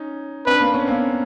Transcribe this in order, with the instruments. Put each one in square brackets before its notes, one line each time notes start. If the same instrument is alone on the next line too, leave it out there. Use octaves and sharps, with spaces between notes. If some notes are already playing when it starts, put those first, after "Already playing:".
Already playing: [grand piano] C#4 D#4
[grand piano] C4 D4 [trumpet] B4
[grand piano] A#3 C4
B3 C#4
A#3 C4